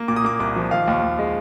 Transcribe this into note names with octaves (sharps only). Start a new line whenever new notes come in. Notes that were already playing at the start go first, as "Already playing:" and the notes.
Already playing: A#3
A#2 D6
D#6
A#3 D6
C2 D6
F3
D#3 F5
D#2
D#2
G#3